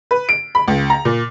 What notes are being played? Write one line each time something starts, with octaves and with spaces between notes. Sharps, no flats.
B4
D7
B5
C#2
A#5
A#2